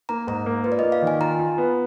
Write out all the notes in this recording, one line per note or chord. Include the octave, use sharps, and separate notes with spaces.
A#3 A#5
G#2 A#5
A#3
F4 B4
D5
A#3 D#5
F5
D#3
G#5
F4 A#5
F4
B3